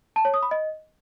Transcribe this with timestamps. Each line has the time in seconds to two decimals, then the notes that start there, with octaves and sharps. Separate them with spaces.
0.16 A5
0.25 C#5
0.34 D#6
0.43 B5
0.51 D#5